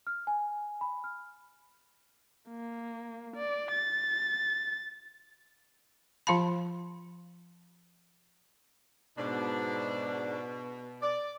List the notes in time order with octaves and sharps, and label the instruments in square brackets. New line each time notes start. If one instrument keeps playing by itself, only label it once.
[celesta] F6
G#5
B5
F6
[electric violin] A#3
D5
A6
[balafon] F3 F4 F5 A5 B5
[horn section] G#2 D4 [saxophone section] B2
[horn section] D5